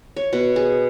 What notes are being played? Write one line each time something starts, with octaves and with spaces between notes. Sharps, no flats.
C#5
B2
G#4